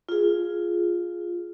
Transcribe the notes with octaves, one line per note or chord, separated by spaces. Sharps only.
F4 G#4